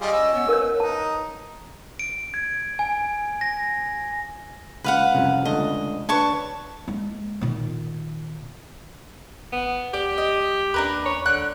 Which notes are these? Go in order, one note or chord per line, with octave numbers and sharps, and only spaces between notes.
G3 F4 G#4 D#5
C#4 E6
B3
A#4 B4 C#5
D#4 A5
D7
G#6
G#5
A#6
C#2 B4 F5 F#5
C2 F2 C#3
C#2 D3 A3 D#5
D4 B4 C#5 A5 C#6
G#3 A#3
A#2 D#3
G#1 B3
C#2 G4 D5
D#5
D#2 D4 A#4 B4
C#5
C#2 D3 F#6